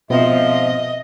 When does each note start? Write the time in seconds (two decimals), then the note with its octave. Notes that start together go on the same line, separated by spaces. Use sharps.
0.10 G#2 B2 F3 B3 C4 D#5 E5